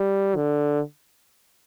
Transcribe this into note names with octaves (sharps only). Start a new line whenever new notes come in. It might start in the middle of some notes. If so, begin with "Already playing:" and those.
Already playing: G3
D3